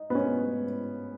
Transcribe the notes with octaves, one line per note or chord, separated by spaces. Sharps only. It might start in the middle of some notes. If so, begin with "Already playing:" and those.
Already playing: D#4
B3
C#4